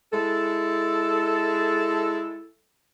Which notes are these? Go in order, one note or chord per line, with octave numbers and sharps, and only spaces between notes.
G#3 E4 A4